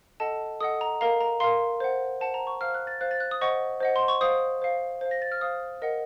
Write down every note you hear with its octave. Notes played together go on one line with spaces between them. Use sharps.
A4 D#5 F#5 A5
A4 D#5 F#5 D#6
A#5
A#4 F5 A#5
A#5
A#4 F5 C6
C5 F#5
C5 F#5 A5
A#5
C#6
C5 F5 F6
F#6
A6
C5 F5 F#6
A6
F#6
D#6
C5 D#5 F#5 C#6
C5 D#5 F#5
C6
C#6
C5 F5 D#6
C5 F5
C5 F5
A#6
A6
F6
C5 F5 D#6
A#4 D#5 F#5